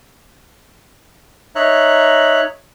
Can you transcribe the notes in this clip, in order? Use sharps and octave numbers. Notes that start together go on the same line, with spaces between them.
D#4 C#5 E5 A#5 F#6